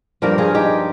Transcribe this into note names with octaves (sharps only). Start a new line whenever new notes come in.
G2 F3 A#3 G4 A#4
F4 G#4
D#4 G4